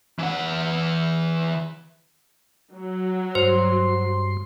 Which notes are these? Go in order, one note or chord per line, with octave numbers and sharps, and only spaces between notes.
E3 F#5
F#3
G2 C5 C6